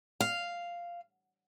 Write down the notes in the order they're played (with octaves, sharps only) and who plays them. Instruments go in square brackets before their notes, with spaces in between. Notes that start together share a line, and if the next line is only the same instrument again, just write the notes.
[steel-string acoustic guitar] F5